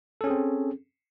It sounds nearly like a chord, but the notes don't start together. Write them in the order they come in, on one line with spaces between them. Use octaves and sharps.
A4 C#4 G#4 C4